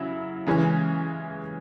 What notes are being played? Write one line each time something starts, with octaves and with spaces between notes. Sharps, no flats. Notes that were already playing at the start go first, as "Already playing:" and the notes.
Already playing: C#3 F#3 E4
C#3 E3 G#3 C#4